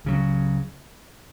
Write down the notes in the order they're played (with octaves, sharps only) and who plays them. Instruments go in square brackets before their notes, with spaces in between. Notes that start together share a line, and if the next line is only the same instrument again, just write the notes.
[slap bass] C#2 C#3 F#3